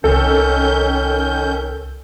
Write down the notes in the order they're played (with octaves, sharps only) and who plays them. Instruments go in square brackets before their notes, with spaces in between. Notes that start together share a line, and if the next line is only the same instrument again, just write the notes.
[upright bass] C2 [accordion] D#3 C#4 G6 [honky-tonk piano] A4